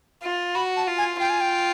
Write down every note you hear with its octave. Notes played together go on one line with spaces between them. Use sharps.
F4
F#4 B5
A5
F4
G#5
F4 G5
G#5
G5